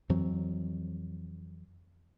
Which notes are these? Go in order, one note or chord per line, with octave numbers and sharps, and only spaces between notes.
F2 E3 F#3 C4